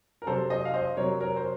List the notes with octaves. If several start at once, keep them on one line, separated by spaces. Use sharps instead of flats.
A#4
C3 F#3 C4 A4 C5
C5 D#5
F5
C5 D#5
C3 F#3 C4 A#4 C#5
A#4 C#5
C5